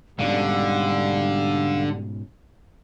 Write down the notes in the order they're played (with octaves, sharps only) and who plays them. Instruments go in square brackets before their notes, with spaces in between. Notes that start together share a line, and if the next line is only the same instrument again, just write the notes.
[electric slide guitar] G#2 B2 C#4 [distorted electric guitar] D3 [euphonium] G3 [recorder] F5